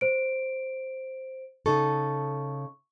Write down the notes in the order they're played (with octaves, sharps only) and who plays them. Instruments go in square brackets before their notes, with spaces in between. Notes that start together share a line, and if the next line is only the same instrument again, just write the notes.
[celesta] C5 D7
[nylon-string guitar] C#3 D#4 A4 [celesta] C#6